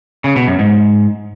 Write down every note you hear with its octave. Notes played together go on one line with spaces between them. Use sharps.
C#3
B2
F#2
G#2